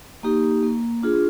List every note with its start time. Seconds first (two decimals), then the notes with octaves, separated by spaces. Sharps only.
0.23 A#3 D#4 G4
0.63 A#3
1.02 D4 F4 G#4